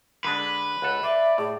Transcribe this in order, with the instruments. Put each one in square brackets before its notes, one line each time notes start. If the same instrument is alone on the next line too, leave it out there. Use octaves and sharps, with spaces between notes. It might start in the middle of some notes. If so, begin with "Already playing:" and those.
[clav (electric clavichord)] D3 G#3 D4 [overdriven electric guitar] B4
[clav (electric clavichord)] C#2 A4 [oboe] F#5
[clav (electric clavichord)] C5 [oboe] D5 [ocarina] E5
[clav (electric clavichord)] A2 [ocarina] G#4